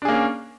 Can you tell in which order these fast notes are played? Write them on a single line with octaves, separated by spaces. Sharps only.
D4 G#4 A#3 C#4